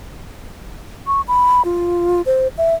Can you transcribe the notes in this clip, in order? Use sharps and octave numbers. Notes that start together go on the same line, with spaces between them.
C#6
B5
F4
C5
E5